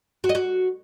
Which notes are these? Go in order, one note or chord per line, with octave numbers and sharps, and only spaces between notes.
F#4
D#5
F#4